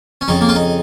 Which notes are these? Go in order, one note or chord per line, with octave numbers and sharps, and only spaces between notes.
C#4
F2 C#3 D#4
A#3
F4
D#4